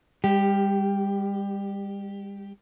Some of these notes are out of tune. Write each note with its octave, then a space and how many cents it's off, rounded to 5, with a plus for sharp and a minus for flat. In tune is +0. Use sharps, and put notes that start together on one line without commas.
G3 +35 G4 +0